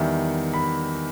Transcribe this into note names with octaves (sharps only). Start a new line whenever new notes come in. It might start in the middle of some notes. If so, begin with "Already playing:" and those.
Already playing: E2 D#3 G3 E5
B5